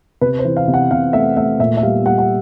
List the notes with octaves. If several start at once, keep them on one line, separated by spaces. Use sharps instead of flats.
C3 B4
C5
E3
F5
C3
F#5
C3 F5
A3 E5
A3 E5
A#2 E5
E5
G3 F5
G3 F#5
F#5